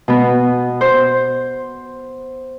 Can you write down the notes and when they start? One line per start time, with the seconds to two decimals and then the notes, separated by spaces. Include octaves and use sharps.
0.08 B2 B3
0.81 C5